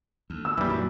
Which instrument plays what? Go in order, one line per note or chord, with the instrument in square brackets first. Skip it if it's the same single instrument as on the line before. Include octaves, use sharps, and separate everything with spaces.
[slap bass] D2
[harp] B3 [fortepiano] E6
[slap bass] A#1 [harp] F#2 [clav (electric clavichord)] E3 G3
[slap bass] A#1 [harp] D#4